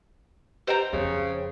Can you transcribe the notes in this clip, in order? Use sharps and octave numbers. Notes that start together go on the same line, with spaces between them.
G4 C5 D#5 G5 A#5
F2 C#3